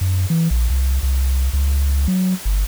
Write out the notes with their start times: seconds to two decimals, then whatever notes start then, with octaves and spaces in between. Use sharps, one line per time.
0.01 F#2
0.30 E3
0.51 A#1
0.70 C2
1.03 C2
1.53 C#2
2.08 F#3
2.45 G1